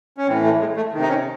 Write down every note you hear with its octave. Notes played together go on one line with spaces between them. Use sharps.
C#4
A2 E3 C4
A3
G#3
A3
C3 D#3
D#4
C#4